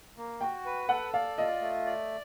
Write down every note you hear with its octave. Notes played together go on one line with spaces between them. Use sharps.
A#3
F#4 G5
B4
A4 F#5
D5 F5
F4 D#5
A3
D5